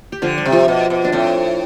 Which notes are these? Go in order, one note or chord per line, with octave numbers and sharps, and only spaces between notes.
G4
D3 F3 F4
G3 G4
C3
F3 F4
B2
B2
D4
A2 C4